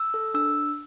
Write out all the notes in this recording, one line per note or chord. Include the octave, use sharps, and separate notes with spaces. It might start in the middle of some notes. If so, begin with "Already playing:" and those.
Already playing: E6
A4
D4 E6